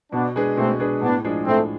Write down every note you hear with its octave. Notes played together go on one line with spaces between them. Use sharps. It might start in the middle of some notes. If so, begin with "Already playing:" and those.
B2 B3 D4
G#3 D4 G#4 B4
B2 A3 C4
G#3 D4 G#4 B4
A2 B3 D4
F3 G#3 D4 G#4
A2 A3 C4